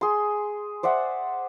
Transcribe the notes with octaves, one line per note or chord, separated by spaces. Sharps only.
G#4 C6
C5 D5 E5 F#5